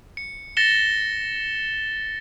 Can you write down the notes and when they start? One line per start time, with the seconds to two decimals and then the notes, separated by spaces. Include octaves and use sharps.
0.17 C#7
0.57 A6 A#6 C#7 E7 G7